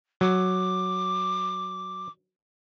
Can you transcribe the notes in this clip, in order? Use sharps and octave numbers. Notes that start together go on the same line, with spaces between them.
F#3 D6